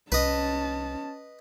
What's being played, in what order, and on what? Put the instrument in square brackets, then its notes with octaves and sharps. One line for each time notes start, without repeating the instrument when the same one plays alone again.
[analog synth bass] C2 [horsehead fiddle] C#4 A5 [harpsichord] B4 D#5